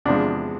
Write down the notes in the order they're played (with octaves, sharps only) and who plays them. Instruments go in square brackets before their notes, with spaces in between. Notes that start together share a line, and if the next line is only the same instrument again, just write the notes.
[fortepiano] E2 C3 F3 G#3 D4